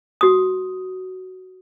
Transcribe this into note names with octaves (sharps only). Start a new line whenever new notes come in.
F#4 D#6